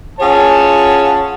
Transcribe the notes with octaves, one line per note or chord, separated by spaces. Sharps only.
C#4 F4 G#4 C#5 F#5 A5